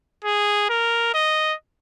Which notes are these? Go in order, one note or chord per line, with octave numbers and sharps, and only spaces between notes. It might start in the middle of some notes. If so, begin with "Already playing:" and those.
G#4
A#4
D#5